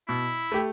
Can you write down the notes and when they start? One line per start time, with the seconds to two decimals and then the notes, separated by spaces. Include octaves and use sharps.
0.08 B2 E4
0.52 A3 G4